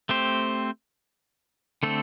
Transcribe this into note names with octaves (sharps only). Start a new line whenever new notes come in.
A3 C4 G4 C5
D3 A3 C4 A4